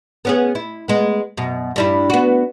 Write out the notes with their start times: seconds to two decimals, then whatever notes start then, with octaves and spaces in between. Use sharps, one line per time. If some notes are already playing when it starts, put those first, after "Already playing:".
0.25 B3 C#4 G#4
0.55 E4
0.88 G#3 B3
1.37 F#2 B2
1.76 G2 G3 E4
2.10 B3 F#4